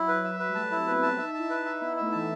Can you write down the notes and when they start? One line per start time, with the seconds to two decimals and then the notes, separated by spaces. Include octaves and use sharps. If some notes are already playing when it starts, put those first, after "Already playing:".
Already playing: F#3 E4
0.08 B4
0.24 E5
0.39 B4
0.49 G3
0.55 A3 A5
0.71 E4
0.77 C4
0.87 B3 B4
0.97 C4
1.03 A5
1.18 D#4 E5
1.34 E4 A5
1.50 E4 B4
1.61 D#4 E5
1.81 B3 E4
1.97 A3 E5
2.12 E3 A5